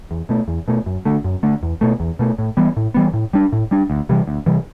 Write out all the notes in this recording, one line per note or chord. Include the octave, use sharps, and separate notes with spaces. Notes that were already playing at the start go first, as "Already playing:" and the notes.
E2
B2 A3
E2
B2 A3
F#2
D3 A3
F#2
D3 A3
E2
B2 A3
E2
B2 A3
A2
E3 G3 B3
A2
E3 G3 B3
A2
G3 D4
A2
G3 D4
D2
C3 E3 G3
D2
C3 E3 G3